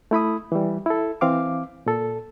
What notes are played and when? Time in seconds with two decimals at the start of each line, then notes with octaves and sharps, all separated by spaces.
0.11 A3 E4 B5 D#6
0.52 E3 G3
0.86 E4 A4
1.21 E3 C4 F5 D6
1.86 A#2 A4